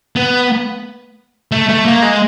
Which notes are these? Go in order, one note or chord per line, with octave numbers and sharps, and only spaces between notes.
B3
A3
A3
A#3
G#3